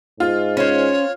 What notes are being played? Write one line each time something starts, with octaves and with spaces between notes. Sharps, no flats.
G#2 F4
C#4 C5 C#5